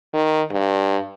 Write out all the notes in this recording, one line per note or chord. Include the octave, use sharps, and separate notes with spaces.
D#3
G2